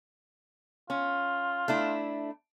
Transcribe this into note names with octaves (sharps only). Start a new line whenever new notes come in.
C#4 F4
A3 D4 E4